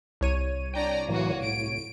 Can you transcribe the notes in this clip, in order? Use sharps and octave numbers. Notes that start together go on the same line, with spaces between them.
C2 C#5 D#7
D4 D5 G5 A#5
A2 E3 F#3 A#3 F#4
A2 D7